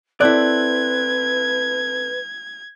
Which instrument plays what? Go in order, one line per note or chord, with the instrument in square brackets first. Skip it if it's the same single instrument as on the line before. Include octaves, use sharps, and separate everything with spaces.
[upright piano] C4 A4 F#6 [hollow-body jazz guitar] E4 D5 [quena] B4 [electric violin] G#6